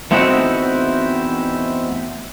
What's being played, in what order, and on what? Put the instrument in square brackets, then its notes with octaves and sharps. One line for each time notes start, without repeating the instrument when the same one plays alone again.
[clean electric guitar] E2 A3 C4 D#4 E4 F#4